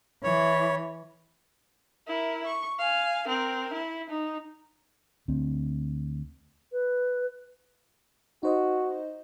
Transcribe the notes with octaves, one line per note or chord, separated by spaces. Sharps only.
E3 C#5
E4 A#4
C#6
F5 G#5
C4 A#4
E4
D#4
D2 C4
B4
D#4 F#4 C5 D#5